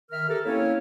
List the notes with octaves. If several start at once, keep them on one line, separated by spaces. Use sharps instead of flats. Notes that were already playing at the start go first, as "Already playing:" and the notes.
D#3 A#4 E5 F6
G4 A4 A#4
A#3 C4 C#4 E4 C#5